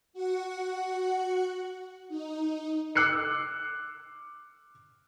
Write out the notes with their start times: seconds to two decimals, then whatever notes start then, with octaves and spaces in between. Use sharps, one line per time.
0.13 F#4 F#5
2.09 D#4
2.95 D6 E6 F#6 C7 C#7